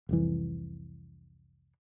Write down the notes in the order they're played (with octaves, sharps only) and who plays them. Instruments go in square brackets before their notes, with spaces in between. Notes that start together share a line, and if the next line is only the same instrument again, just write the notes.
[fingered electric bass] F1 C2 E3